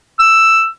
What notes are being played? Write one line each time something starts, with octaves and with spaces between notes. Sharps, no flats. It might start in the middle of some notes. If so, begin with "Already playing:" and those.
E6